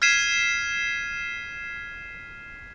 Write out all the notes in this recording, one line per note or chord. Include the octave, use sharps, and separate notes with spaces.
F6 G#6 B6 C7 D#7 E7